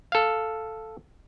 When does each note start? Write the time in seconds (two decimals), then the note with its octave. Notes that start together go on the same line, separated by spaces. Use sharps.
0.12 A4 F5